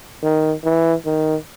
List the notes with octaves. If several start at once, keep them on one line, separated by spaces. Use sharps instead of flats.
D#3
E3
D#3